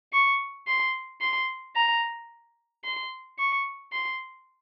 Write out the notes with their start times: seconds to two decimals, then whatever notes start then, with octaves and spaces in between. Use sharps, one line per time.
0.13 C#6
0.67 C6
1.21 C6
1.76 A#5
2.84 C6
3.39 C#6
3.92 C6